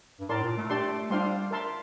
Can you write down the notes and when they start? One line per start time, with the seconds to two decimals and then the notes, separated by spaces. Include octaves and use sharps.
0.20 G2
0.29 A2 A#4 D5 A5 C6
0.43 A#2
0.57 A3
0.70 D4 G4 D5 A5 C6
1.10 G3 D4 F4 C5 F5 C6
1.51 A#4 E5 A5 C6